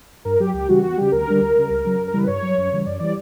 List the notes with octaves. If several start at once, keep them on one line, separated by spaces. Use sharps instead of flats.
G2 A#4
F#3 G4
C#2 G4
C#3 E3 G3 F#4
E2 F#4
C#3 G3 G4
D2 A#4
D3 G3
D2
C#3 G3
C#2
C#3 F#3
F#2
A#4
C#3 E3 G3 B4
G2 C#5
F#3
F#2
C#3 E3 G3
F#2 D5
E3 G3 D5